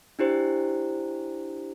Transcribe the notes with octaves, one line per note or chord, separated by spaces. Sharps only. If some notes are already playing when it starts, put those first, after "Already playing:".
D4 E4 G4 C5